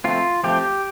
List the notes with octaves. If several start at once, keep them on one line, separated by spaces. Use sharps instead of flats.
F3 A3 C4 F4
F3 A3 C4 G4